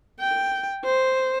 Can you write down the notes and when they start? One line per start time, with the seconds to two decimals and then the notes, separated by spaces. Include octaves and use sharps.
0.20 G5
0.84 C5